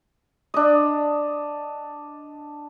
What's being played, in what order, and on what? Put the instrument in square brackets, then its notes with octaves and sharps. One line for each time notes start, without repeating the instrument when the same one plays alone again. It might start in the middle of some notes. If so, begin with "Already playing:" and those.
[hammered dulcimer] D4 D#5